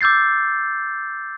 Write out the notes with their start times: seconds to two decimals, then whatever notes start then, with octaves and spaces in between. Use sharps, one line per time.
0.01 D6 E6 G6 A6 C7